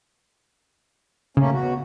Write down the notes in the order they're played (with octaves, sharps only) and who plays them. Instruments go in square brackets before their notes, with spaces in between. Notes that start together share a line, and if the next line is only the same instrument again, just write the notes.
[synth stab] C#3 [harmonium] A3 A#3 C#4
[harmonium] B2 F#4